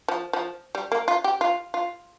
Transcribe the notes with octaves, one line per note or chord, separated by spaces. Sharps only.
F3
F3
G3
A#3
F4
G4
F4
F4